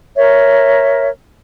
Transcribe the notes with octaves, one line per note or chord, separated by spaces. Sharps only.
A#4 C#5 E5